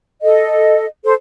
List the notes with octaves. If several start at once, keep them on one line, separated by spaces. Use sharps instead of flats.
A4 D#5
A4 C5